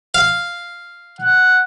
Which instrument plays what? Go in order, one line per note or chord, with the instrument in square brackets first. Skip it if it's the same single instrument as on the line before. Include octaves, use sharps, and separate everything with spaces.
[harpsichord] F5
[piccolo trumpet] F#5